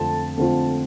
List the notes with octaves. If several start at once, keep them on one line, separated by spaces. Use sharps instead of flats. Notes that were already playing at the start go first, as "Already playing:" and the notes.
Already playing: F2 D3 A3 C4 F4 A5
F2 D3 A3 C4 F4